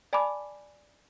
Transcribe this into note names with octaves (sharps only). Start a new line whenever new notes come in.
D5 G#5 A5 B5 D6